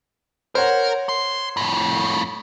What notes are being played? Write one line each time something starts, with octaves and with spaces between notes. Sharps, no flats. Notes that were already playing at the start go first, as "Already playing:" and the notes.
A#4 C5 C#5 F#5
C6
F2 A2